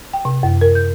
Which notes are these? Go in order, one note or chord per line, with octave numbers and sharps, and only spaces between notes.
G5
C3
F#2
A#4
G6